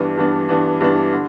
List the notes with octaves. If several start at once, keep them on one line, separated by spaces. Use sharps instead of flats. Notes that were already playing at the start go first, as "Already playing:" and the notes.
Already playing: G2 E3 B3 D4
G2 E3 B3 D4
G2 E3 B3 D4
G2 E3 B3 D4
D3